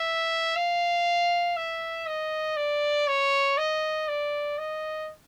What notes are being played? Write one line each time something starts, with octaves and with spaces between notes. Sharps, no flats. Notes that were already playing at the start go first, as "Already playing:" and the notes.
Already playing: E5
F5
E5
D#5
D5
C#5
D#5
D5
D#5